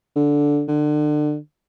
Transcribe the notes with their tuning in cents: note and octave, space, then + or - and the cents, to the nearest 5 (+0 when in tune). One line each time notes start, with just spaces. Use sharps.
D3 -10
D3 +30